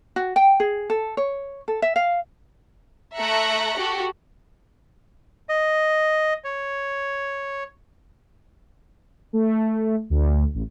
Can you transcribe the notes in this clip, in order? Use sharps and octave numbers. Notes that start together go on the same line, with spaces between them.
F#4
G5
G#4
A4
C#5
A4
E5
F5
A3 E5 A#5 F#6 A#6 C#7
F#4 G4 A4
D#5
C#5
A3
D2
A1